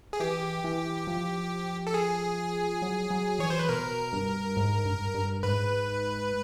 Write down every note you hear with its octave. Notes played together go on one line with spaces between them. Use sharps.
G#4
E3 G4
E3
F3
A4
G#4
F#3
F#3
E3 C#5
C5
B4
B2 A#4
G2
G#2
G2
G2
G#2 B4